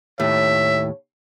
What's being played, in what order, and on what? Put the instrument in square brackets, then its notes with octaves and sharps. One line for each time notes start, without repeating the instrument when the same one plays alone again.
[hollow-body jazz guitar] D#2 A2 [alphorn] C#5 [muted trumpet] E5